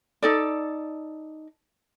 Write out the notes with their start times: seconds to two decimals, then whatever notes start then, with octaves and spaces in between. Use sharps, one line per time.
0.22 D#4 A4 D5